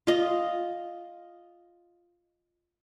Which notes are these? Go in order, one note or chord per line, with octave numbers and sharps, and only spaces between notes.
F4 D#5